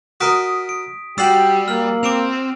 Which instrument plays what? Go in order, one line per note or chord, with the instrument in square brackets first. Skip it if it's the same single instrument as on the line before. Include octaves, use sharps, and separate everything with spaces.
[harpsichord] F#4 A#4 D#5 [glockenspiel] D#6 B6 D7
[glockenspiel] D7
[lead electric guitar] G3 [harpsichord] F#4 D5 [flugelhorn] G4 [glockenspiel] E6 C7 F#7
[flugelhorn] A#3 [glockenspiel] F6 F#7
[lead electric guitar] C4 [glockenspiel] D6 D7 F7